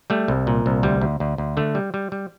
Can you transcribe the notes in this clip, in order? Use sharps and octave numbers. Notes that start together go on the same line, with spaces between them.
G3 A3
C2
A#2
C2
D2 G3
D2
D2
D2
D3 A3
G3
G3
G3